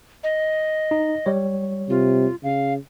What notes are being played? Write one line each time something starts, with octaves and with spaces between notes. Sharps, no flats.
D#5
D#4
G3 C#5
C3 F4
C#3 F5